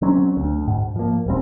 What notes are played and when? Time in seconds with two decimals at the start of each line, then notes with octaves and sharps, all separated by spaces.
0.02 F#3 C4 C#4
0.37 D2
0.68 G#2
0.96 F3 A#3
1.26 D#1 G3 C4